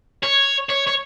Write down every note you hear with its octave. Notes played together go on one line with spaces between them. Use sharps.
C#5
C#5
C#5